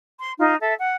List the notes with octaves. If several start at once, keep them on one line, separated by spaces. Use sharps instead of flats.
C6
D#4 F4
A4 E5
F#5